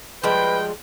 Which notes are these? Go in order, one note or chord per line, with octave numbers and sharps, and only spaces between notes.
F3 G3 G#3 B4 G5